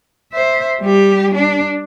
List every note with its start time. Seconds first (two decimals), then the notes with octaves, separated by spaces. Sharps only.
0.33 C5 E5
0.81 G3 G4
1.35 D4